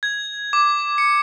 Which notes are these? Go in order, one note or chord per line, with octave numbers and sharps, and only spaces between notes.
G#6
D6
C#7